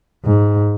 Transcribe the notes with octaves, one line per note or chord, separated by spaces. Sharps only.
G#2